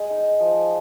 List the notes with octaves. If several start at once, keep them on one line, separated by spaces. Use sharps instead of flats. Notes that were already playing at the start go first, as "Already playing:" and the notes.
Already playing: G#3 G#4
D#4
F3